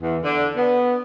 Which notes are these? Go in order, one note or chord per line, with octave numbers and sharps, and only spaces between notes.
E2
D3
B3